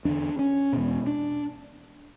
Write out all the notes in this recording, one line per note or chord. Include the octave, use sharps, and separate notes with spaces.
E2 D3 D4
C#4
E2 B2
D4